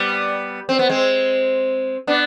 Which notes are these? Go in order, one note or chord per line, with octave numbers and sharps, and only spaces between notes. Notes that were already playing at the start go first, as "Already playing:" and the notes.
Already playing: G3 B3
C4
B3
G#3 C4
B3 D4